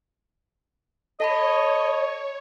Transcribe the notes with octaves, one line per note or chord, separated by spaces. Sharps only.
A4 C#5 D#5 A5 B5